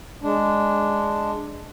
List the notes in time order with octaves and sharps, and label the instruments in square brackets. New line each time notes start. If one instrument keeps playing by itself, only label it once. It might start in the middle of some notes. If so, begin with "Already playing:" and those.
[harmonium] G#3 D4